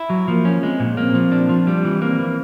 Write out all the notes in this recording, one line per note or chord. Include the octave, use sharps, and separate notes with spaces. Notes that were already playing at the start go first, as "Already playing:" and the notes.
Already playing: E4
F#3
F3 A#3
C#4
G#3 C4
A#2
A#3 C4
F3
D4
F3
G3
E3
A#3 C4
E3